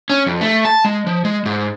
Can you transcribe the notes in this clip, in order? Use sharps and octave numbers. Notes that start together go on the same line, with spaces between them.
C#4
F2
A3
A5
G#3
F3
G#3
G#2